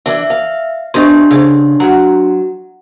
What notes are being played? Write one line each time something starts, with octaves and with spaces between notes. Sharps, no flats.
E3 D4 E5
F5
E2 D4 G4 C5 D#5 C6 C#6
C#3 G#4 C5
F#3 F#5 A#5